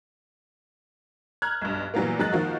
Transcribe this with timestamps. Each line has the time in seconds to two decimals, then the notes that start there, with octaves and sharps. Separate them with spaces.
1.42 A#5 F6 F#6 G#6
1.61 B1 G2
1.94 A#2 E3 F#3 G3 A#3 B3
2.19 F2 F#3 G#3 F#6 A6
2.32 D#3 F3 A#3 D#4 F#4